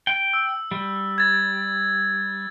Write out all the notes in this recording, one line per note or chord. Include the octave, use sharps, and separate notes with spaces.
G5
E6
G3
G#6 A6